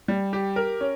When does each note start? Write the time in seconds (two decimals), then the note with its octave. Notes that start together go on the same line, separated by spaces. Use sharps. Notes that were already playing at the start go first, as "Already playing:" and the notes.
0.08 G3
0.33 G4
0.56 A#4
0.81 C#4